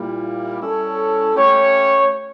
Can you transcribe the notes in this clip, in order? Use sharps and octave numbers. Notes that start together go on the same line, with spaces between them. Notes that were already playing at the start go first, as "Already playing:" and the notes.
Already playing: A#2 G3 A#3 E4
G3 C#4 E4 A4 C#5
A3 C#4 G4 C#5